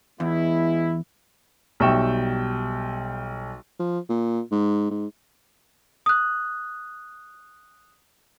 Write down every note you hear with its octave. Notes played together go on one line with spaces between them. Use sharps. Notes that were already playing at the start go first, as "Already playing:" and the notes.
E2 G#3 B3 E4
B1 G3 E5 G5 C#6 E7
F3
A#2
G#2
G#2
D#6 F#6